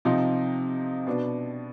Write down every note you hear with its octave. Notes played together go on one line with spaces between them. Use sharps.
C3 F3 C4 D#4
B2 B3 D4